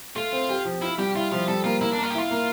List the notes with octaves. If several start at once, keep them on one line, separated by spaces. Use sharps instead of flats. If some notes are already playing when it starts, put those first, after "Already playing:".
A3 F4
C4
G4
F3
E4 F4
G3 G4
E4 F4
F3 F4
G3 A4
A#3 F4
A#3 E4
D4
A#3
F4
G4
E4 F4
A#3